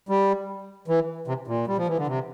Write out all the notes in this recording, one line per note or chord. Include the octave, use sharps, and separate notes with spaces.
G3
E3
C3
A#2
G3
F3
E3
D3
C3